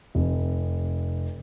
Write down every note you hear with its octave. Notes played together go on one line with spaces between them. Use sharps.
F1